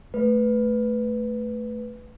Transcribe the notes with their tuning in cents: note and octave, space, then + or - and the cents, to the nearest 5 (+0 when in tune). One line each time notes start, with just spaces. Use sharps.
A3 +0 B4 +0